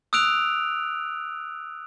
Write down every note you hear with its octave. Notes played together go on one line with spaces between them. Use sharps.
D#6 E6 F#6 D7 F7